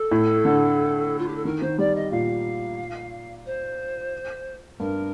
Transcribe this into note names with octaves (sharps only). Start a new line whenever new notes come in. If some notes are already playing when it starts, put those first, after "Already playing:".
Already playing: A4
A2
D3
F4
G4
A4
D#3 A#4
D#3 C5
G3 D5
D#5
A#2 F5
C5
G2 A#4